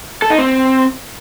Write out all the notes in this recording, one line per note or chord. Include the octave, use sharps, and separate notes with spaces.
A4
D#4
C4